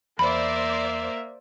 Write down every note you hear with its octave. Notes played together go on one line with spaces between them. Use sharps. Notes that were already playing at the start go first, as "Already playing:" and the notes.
E2 A#3 C5 D5 E5 B5